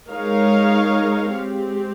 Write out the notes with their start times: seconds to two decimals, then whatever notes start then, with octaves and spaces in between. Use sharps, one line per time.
0.10 G#3 D#4 A#4 C#5 F5
1.34 G#3 C4 G4